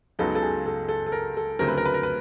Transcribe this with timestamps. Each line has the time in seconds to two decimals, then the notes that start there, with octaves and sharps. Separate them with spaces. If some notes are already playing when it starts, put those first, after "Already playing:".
0.19 C#2 C#3 F#3 B3 D#4 A4
0.35 A4
0.42 G#4
0.66 A4
0.89 A4
1.06 A4
1.12 A#4
1.37 A4
1.59 D2 C#3 F#3 A3 C4 A#4
1.68 B4
1.78 A#4
1.85 B4
1.94 A#4
2.03 B4